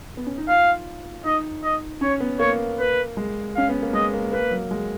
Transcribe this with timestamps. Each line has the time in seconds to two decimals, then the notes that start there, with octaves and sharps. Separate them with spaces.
0.17 B3
0.27 C#4
0.38 D#4
0.48 F4 F5
1.24 D#4 D#5
1.64 D#5
2.01 C#4 C#5
2.20 B3
2.39 A#3 C#5
2.79 B4
3.17 G#3
3.55 C#4 F5
3.69 B3
3.82 A#3
3.93 G#3 D#5
4.14 A#3
4.33 A#3 B4
4.51 F#3
4.71 G#3